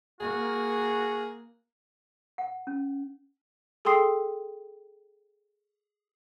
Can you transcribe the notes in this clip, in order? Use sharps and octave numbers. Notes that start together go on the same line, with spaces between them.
A#3 F#4 G#4
F#5
C#4
G#4 A4 G5 C6 D#6 C7